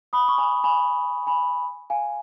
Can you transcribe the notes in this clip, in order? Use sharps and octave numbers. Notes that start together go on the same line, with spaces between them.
B5 D#6
C#6
G#5 B5
G#5 B5
G#5 B5
F5 G#5